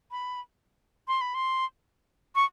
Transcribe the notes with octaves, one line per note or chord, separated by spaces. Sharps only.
B5
C6
B5
C6
C#6